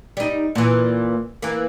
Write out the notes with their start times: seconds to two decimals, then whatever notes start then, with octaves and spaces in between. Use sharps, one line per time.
0.17 G3 D#4
0.55 A#2 E3
1.42 E3 A#3